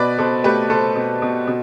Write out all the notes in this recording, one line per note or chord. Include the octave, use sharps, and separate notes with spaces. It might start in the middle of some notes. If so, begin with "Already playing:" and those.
Already playing: B2 B4 D5
B2 A4 C5
A3 G4 B4
A3 A4 C5
B2
B2
B2